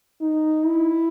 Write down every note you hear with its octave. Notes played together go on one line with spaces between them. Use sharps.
D#4
E4